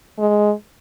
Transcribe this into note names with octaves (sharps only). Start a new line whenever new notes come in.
G#3